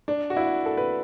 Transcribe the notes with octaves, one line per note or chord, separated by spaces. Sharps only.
D4
F#4
E4
A4
B4